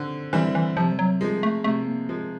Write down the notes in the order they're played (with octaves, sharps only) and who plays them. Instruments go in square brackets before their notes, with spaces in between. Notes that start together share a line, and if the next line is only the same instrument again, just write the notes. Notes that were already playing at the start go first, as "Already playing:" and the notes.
Already playing: [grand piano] D3 C4
[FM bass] E3 [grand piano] G3 C4 E4
[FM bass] E3
[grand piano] C3 [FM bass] F3
[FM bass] G3
F#3
[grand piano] F3 G#3 [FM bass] G3
[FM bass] A3
[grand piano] C3 [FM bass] A3
[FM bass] A#3
[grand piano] F3 G#3